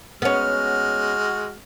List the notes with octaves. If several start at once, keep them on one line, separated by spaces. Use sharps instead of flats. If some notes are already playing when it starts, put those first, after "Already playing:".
G#3 B3 C#4 F#4 F6